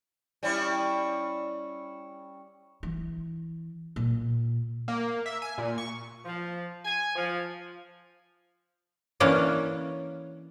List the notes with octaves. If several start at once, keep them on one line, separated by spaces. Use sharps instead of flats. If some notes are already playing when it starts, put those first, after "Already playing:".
G3 C#4 E4
E3
A#2
A#3
E5
G#5
A#2
C#6
F3
G#5
F3
E3 A#3 C#4 D4